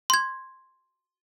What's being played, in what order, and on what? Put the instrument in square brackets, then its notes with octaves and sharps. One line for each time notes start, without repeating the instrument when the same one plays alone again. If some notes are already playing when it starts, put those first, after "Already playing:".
[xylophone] C6 G#6